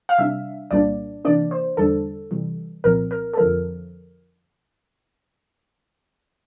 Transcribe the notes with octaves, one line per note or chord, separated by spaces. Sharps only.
F5
C3 G3 D4 E5
C2 A#2 G3 A#3 D4 D5
C3 E3 A#3 D4 D5
C5
E2 D3 G3 D4 A4
C3 E3 G3
C2 A#2 F3 C4 A#4
A#4
A4
F2 D3 F3 A3 A#4